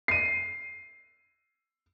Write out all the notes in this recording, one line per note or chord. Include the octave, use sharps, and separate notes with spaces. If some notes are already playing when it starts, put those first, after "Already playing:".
C7 D#7